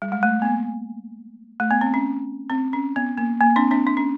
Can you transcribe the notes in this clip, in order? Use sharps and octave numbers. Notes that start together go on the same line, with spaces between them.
G3
G#3
A3
B3
A#3
A3
B3
C4
C#4
C4
C#4
B3
A#3
A#3
C4 D4
C4 D4
D4
C#4